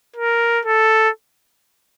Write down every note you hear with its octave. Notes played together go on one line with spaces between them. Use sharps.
A#4
A4